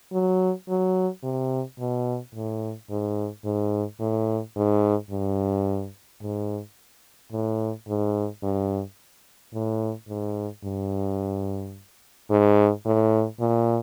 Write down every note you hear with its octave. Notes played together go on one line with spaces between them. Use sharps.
F#3
F#3
C3
B2
A2
G#2
G#2
A2
G#2
G2
G#2
A2
G#2
G2
A2
G#2
G2
G#2
A2
A#2